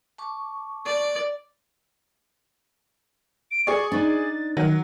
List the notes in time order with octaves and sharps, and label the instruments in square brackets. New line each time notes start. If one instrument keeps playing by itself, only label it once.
[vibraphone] A5 C#6 D6
[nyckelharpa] D5
[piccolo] D7
[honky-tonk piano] G#4 D5 [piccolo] C#6
[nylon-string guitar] D4 D#4 [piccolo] A6
[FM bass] D#3 [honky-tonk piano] F#3